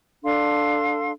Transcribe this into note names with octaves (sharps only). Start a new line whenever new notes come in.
D4 A4 F5 C6